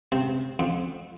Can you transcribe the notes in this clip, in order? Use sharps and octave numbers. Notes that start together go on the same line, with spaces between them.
C3
F2